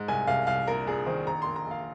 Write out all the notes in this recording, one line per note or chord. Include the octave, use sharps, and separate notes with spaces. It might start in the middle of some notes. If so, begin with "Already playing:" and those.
Already playing: G#2
C2 G#5
C2 F5
C2 F5
A#1 A#4
A#1 G#4
D#3 C5
A#1 A#5
A#1 C6
A#5
A#1 F5